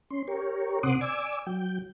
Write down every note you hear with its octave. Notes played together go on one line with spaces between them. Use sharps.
C#4 C6
G4 A#4 C#5
C3 C4 F#5 C6 D6 D#6
D5 G#5 D6 E6
F#3 G5